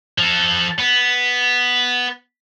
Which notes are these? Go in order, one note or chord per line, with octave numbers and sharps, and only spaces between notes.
F3 A4
B3